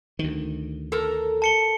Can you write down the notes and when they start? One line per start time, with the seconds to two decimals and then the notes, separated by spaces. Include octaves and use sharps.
0.19 D2 D#3
0.92 A4 A#4
1.42 A5 C#7 G7